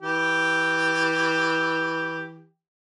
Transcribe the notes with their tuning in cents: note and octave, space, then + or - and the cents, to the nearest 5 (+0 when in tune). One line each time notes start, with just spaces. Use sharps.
E3 -15 G4 +0